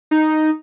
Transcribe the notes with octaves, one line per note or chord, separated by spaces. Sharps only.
D#4